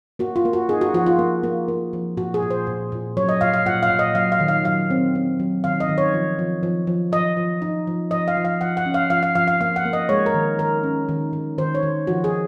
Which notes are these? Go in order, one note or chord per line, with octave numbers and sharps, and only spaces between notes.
A#3 F#4
F4
A#3
F#4
D#4 G#4
F#4
F3 F#4
F4
A#3
A#3
A#3
F3
A#2 F#4
G#4
A#2
C5
A#2
A#2
F#3 C#5
D#5
A#2 F5
F5
A#2 F#5
F5
A#2
D#5
F#3 F5
F5
D#3
F5
F#3 F5
C4
C4
F#3
D#3 F5
D#5
D#3
C#5
F3
F3
F3
F3
F3 D#5
F3
D#4
F3
F3 D#5
F5
F3
F5
F3 F#5
F#5
C#4
F5
F3 F5
F5
F3 F5
F5
A#3 F5
F#5
A#3
D#5
G#3 C#5
A#4
D#3
D#3 A#4
C#4
D#3
D#3
D#3 C5
C#5
D#3
F3 F#4
G#4